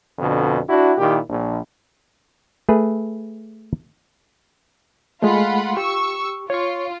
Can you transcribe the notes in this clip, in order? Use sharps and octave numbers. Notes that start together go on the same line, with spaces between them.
F2 B2 D3
D4 E4 F#4
A#2 D#3 E4 G4
A#1
A3 G#4 B4
G#3 A3 F4 F#5 B5
G4 C#6 E6
F4 C#5 C#6